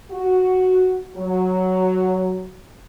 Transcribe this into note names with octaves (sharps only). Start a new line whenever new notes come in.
F#4
F#3